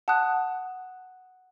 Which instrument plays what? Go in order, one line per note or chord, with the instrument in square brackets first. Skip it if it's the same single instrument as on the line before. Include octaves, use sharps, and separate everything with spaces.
[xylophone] F#5 A5 D#6 F#6